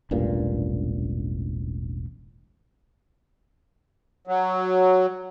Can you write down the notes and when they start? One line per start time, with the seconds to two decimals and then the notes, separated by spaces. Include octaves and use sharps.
0.11 E1 A1 G2 A#2
4.27 F#3